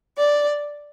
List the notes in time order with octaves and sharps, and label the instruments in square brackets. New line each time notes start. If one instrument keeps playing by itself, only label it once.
[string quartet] D5